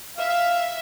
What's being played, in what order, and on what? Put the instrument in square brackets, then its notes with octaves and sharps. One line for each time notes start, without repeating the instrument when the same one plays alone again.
[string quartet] E5 [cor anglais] F5